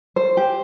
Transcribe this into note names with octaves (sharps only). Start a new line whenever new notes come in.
C5
G4